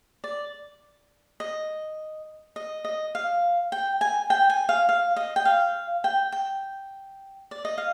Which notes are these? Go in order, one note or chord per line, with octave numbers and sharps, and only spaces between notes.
D5
D#5
D#5
D#5
F5
G5
G#5
G5
G#5
F5
F5
D#5
G5
F5
G5
G5
D5
D#5
F5